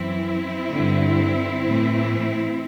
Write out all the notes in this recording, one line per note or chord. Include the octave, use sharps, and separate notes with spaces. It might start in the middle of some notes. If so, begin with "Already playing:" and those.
Already playing: F#2 E3 C4 E4
G2 D3
A2 E3